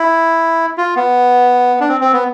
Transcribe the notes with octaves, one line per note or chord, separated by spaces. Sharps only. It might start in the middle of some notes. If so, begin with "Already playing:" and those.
Already playing: E4
F4
B3
D4
C4
C4
B3